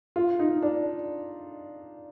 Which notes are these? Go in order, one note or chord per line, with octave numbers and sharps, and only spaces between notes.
F4
D#4
D4